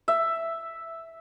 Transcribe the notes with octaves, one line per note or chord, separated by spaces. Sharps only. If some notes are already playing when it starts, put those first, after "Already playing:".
E5